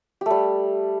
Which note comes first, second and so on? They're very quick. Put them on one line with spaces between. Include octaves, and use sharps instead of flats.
G4 A3 G3